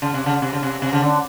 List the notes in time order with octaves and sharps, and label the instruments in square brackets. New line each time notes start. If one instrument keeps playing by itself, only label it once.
[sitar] C#3
C3
C#3
C3
C#3
C3
C3
C#3
D3